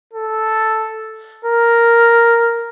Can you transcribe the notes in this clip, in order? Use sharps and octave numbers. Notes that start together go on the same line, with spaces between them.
A4
A#4